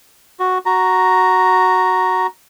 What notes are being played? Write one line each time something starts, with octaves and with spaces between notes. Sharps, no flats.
F#4
F#4 A#5